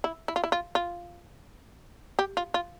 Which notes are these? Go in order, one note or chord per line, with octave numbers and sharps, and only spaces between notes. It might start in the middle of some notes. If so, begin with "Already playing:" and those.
E4
E4
F4
E4
F4
F4
G4
F4
F4